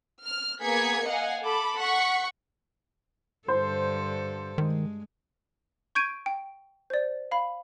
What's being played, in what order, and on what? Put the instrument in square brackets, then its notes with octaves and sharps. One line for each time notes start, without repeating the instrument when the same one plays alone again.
[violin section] F6
A#3 B3 G#4 G#6 B6 C#7
D#5 F5 F#5 G#5
A4 B5 D6
F#5 C#6 B6 C#7
[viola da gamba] G2 D3 A4 [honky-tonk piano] C5
[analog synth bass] D#3 [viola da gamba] G#3
[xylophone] C#6 G6 G#6 D7 D#7
G5
C5 D5
F5 B5